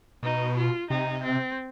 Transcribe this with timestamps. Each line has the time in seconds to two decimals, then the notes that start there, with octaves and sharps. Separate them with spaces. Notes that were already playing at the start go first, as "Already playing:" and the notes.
0.23 B2 D#4
0.56 F4
0.90 C3 D#4
1.24 C4